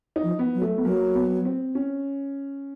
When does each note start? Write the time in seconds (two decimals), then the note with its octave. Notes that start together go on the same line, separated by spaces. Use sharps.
0.16 D#4
0.23 F3
0.39 B3
0.55 F#3
0.62 A3
0.78 B3
0.84 F#3 A#3
1.15 B3
1.45 C4
1.75 C#4